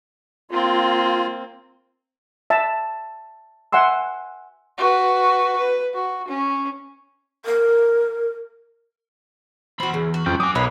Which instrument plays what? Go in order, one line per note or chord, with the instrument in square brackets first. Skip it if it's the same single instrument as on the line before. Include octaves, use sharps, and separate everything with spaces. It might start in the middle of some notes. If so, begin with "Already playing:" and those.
[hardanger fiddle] A#3 C4 [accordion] F4
[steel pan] E5 A5
E5 F#5 G#5 C6 E6
[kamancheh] F#4 B4
B4
F#4
C#4
[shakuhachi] A#4
[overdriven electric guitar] E2 B5 [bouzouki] C4 F#4
[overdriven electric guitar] E2 [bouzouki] C#3
[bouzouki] F#4
[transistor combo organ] F2 G5 [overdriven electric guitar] C#4 F4
[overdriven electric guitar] F#3 G#5 [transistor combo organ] D6 [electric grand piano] D#6
[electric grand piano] B1 [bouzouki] A#3 D#4 [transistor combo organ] B4 [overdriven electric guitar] C#5